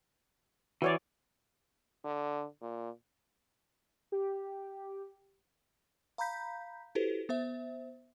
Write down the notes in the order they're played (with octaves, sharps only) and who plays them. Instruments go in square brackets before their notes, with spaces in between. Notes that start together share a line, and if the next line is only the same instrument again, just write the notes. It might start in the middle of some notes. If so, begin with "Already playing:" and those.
[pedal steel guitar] E3 [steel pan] F#4 C#5 D5
[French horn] D3
A#2
[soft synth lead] G4
[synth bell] F5 A#5 B5 G6 B6
E4 F#4 G4 A4 B4 C5
B3 C5 E5